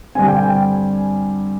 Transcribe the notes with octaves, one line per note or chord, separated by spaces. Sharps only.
G2 D3 G3 C4 G#5
G5
G#5